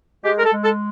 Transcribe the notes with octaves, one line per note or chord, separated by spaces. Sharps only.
G#3 G4
A#4
A4
G#3
A4